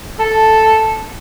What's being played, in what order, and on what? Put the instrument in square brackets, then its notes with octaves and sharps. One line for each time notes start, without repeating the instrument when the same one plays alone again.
[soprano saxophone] A4